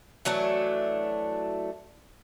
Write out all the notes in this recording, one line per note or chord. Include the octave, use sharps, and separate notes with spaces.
E3 F#3 A3 D4